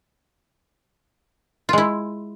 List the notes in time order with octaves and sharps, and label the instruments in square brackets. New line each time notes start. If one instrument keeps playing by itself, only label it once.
[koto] F4
G#3
E4